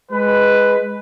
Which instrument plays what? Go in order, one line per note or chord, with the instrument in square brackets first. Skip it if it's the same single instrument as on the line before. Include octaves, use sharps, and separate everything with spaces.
[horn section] G#3 B4